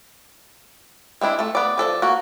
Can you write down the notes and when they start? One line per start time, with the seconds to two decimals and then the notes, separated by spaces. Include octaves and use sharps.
1.21 G#3 C4 D4 E4
1.39 A3 A4
1.55 B3 D5
1.78 F3 C4 A4 D5
2.02 A#3 F#4